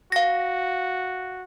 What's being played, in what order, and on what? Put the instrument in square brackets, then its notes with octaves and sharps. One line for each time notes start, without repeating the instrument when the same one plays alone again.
[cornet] F#4 [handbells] F5 A#6